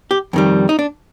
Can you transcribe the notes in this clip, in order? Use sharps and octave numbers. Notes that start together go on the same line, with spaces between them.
G4
F2 D#3 G3
D#4
D4